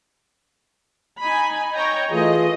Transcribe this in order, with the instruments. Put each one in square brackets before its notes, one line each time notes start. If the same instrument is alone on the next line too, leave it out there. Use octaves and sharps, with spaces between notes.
[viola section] D#4 G#5 B5
[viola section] C#5 G5 A#5 [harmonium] D#5
[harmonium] E3 F4 G#4 [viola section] A3 D#5